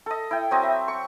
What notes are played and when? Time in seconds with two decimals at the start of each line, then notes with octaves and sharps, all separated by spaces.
0.06 A4 D#5
0.31 E4 G5
0.51 F#3 C4 D#5
0.63 E5
0.88 C#6